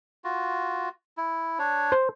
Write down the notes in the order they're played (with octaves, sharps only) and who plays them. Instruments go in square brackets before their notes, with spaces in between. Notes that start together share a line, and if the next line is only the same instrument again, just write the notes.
[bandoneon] F4 F#4
E4
D4 C#5
[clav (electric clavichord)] C5